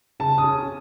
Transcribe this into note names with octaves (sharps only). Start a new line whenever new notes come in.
C#3 A5
D#6
C#4